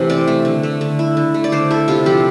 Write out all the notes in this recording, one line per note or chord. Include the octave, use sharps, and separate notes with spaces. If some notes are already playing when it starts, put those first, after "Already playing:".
Already playing: C3 E3 A3 C5
C4 D5
A3
D3
A3
D3
E4
D3
A3
D5
D3 C5
E4 A4
C3 F4
F3 G4